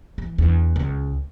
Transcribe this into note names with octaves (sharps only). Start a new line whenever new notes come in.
E3
E2 D4
C#2